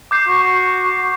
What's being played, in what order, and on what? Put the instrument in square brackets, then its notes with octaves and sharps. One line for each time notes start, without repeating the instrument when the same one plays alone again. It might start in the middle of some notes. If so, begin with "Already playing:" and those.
[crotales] D6 G6 C7
[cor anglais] F#4